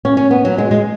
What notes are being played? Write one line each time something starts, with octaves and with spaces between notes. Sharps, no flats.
C#4
C#4
B3
F#3
G#3
G#3